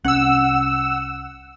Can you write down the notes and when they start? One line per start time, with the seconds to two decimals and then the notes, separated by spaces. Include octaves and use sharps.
0.05 C2 C#4 F#5 E6